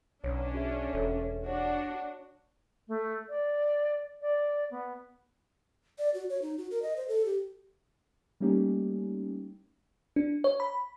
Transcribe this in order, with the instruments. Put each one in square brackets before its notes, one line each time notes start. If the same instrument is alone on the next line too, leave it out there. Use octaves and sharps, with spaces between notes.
[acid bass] B1 [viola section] C#4 D4 [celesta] C#5
[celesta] F#4 G#4 E5
[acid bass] E1 [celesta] A4 C#5 E5
[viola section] D4 F#4 [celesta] C#5
[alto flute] A3
D5
D5
B3
[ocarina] D5
F#4
C#5
D#4
F#4
A#4
D#5
C5
A4
G4
[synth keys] G3 A3 A#3 C#4 D#4 G4
[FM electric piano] D4
C#5
B5